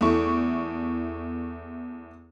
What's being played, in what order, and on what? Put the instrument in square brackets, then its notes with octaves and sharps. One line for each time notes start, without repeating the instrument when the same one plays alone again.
[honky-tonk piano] E2 A3 E4 C#6